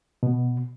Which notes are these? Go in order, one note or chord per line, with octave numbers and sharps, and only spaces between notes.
B2